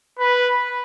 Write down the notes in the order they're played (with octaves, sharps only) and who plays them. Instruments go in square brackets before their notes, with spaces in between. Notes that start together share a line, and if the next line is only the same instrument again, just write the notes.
[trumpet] B4